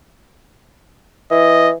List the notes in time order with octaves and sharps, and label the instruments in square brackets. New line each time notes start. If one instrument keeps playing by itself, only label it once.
[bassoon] E3 [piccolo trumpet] D#5